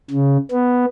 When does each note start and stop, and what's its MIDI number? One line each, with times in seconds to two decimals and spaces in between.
0.10 0.37 49
0.51 0.85 59